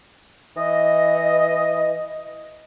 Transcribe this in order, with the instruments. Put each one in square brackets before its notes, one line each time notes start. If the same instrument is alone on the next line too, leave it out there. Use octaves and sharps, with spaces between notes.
[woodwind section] E3 D#5